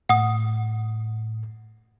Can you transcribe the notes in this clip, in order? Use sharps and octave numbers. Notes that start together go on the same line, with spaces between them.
A2 F#5 D#6